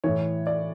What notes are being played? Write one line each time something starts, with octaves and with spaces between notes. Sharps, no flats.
A2 E3 C#5
D5